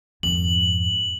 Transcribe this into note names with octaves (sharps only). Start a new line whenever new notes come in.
F2 G#2 F#7